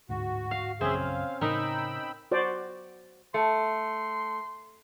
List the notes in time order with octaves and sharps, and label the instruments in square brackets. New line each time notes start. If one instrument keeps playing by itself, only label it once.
[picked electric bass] D1 D2 G#2 [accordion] F#4
[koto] F5
[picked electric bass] A#1 F#2 C#3 [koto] C4 C#4 [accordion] G#4 E5 C6
[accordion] F5
[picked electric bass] A2 C#3 [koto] D#4 A#4 [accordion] G5 B5 E6
[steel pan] F#4 C5 D5
[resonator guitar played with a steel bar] A3 [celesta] A5 C#7 [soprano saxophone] C6